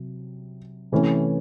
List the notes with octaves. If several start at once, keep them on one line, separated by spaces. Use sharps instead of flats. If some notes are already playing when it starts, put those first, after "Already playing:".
Already playing: C3 F#3
C3 E3 A3 C#4